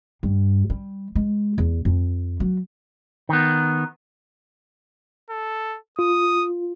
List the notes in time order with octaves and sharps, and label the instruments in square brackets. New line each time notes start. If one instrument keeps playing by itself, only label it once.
[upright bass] G2
G3
G#3
E2
F2
F#3
[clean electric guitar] D#3 B3
[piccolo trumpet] A4
[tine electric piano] F4 [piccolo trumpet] D#6